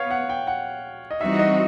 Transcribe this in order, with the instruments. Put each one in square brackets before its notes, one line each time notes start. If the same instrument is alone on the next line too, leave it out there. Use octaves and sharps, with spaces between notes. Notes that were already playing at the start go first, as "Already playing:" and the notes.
Already playing: [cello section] B3 [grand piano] C#5 F5
[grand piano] F#5
G5
F#5
D#5
[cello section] E3 G3 C4 D#4 F#4 [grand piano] E5
[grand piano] D#5